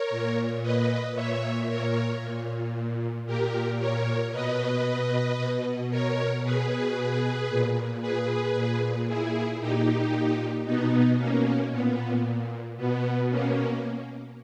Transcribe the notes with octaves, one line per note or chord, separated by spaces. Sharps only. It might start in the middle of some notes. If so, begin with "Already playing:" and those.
Already playing: A#4 C#5
A#2
B4 D#5
A#2 C#5 E5
A#4 C#5
A#2
A#2 G4 A#4
A#4 C#5
B2 B4 D#5
B2
A#4 C#5
B2 G#4 B4
A#2
G#4 B4
A#2
E4 G#4
A#2 D#4 G4
B2 B3 D#4
A#3 C#4
A#2 B3
B2 B3
A#3 C#4